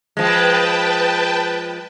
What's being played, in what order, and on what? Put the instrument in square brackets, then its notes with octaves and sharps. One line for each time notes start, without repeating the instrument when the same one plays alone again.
[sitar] F3 G#3 [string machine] B4 G5 A5